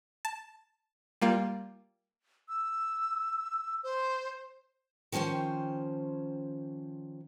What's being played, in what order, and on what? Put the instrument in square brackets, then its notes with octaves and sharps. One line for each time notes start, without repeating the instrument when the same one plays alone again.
[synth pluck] A5
G3 A#3 F4
[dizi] E6
C5
[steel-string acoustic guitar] D#3 F3 C#4 C5 G5